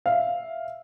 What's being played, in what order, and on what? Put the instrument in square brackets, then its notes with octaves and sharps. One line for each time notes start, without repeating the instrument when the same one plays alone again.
[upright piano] E5 F5